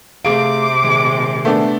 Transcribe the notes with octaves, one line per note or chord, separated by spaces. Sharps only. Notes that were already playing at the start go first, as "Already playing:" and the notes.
C3 A3 G#4 F5 D6 D7
A#2 D#3 G#3
A3 B3 D4